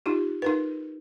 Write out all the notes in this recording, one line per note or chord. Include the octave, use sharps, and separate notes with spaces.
D#4 F4 G4
D#4 A#4 B4